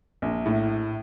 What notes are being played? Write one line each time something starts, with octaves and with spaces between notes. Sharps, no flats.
A#1
A2